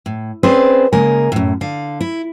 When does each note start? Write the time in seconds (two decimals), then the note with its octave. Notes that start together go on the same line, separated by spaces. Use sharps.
0.06 A2
0.43 C4 C#4 G#4 B4 C5 D5
0.93 C#3 G#3 A#3 A#4 G#5
1.32 F#2 A2
1.61 D3 F5
2.01 E4